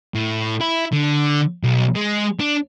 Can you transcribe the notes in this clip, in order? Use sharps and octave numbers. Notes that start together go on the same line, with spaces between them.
A2
E4
D3
B1
G#3
D4